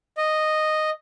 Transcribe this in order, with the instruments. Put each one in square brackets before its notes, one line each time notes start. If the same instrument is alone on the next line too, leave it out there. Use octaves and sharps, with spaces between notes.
[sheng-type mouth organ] D#5